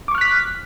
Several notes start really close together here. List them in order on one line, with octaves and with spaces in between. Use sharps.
D6 C#6 F6 F#6 B6